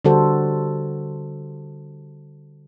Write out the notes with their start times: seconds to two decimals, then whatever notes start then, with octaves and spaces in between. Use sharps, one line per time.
0.05 D3 G3 F#4 A4 C5